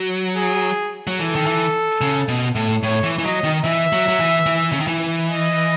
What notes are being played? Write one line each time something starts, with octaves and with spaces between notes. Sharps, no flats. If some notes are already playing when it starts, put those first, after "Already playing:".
Already playing: F#3
G#4
F#3
E3 A4
D#3
E3
C#3
B2
A2
A2 C#5
E3
E3
F#3 D#5
D#3
E3 E5
F#3
F#3
E3
E3
C#3
D#3
E3
D#5